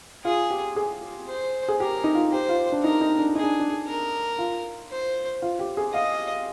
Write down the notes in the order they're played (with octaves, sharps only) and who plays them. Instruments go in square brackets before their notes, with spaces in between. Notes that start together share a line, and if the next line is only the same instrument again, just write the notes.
[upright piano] F4 [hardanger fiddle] G#4
[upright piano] G4
G#4
[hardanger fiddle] C5
[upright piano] G#4
[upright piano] G4 [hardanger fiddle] A#4
[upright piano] D#4
F4
[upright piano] G4 [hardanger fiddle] C5
[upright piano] F4
D4
[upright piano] D#4 [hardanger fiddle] A#4
[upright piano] D#4
D4
[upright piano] D#4 [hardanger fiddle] G#4
[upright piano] D4
D4
[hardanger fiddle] A#4
[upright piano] F4
[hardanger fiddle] C5
[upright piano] F4
G4
G#4
[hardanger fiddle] D#5 [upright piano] F5